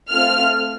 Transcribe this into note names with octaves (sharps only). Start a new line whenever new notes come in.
A3 C4 F4 F6